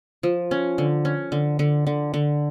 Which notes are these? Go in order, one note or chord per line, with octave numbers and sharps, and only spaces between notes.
F3
C#4
D3
C#4
D3
D3
D3
D3